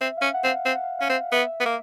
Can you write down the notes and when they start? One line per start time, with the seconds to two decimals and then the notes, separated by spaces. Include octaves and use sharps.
0.01 C4 E5
0.17 C#4 F5
0.34 F#5
0.44 C4
0.49 F5
0.66 C4 F5
0.75 F#5
0.84 F5
0.99 C#4 F5
1.10 C4
1.32 B3 E5
1.60 B3
1.66 A#3